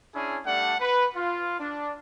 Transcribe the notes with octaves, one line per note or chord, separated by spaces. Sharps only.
C#4 D4 E4 G#4
G3 A3 D4 F#5
B4
F4
D4